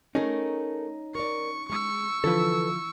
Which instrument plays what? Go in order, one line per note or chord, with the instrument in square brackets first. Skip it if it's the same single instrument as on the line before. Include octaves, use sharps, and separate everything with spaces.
[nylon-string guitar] A3 G#4 A#4 [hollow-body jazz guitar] C#4 D#4
[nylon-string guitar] A#4 D5 [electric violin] C#6
[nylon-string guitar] G#3 [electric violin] C#6 E6
[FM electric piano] D3 F3 F4 [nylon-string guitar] E3 [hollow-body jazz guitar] A4 B4